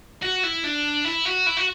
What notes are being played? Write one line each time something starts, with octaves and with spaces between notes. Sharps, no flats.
F#4
E4
D4
E4
F#4
E4
F#4